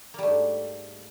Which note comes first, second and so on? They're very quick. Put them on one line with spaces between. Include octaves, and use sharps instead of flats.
A#3 G3 A3 G#2